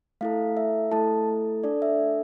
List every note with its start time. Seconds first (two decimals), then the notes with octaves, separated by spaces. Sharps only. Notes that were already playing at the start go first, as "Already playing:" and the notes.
0.21 A3 E4 A4 F5
0.57 E5
0.92 A3 E4 A4 A5
1.64 D4 A4 D5
1.82 E5